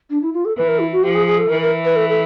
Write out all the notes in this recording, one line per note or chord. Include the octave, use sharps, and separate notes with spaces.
D4
E4
F4
A4
E3 B4
A#4
E4
F#4
F3 G4
G#4
G#4
A4
E3 A#4
A#4
B4
A4
A4